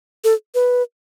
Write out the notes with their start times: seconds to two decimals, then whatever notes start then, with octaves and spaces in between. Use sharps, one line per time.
0.24 A4
0.55 B4